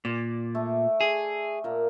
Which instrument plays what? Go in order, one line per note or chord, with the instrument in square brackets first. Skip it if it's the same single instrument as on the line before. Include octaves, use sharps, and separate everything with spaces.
[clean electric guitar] A#2 [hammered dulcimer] D5
[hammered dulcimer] A3
[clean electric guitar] G#4
[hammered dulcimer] A#2 A#3